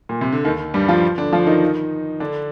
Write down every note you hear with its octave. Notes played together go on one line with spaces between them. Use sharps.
A#2
C3
D3
D#2 D#3
G2 G3
F3 F4
D3 D4
F3 F4
D#3 D#4
D3 D4